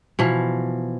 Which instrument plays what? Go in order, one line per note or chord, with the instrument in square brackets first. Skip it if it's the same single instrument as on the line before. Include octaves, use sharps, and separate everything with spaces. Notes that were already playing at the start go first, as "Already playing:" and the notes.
[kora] B2 E3 F3